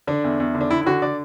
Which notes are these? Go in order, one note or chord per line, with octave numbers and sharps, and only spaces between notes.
D3 D4
E2
E2
D3
D4
D3 E4
E4
D3 F#4
D3 D5